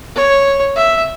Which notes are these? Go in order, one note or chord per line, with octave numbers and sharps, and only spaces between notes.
C#5
E5